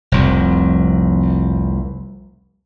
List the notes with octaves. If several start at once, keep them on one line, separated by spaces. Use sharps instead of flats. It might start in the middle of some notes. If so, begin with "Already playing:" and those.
F1 C2 F2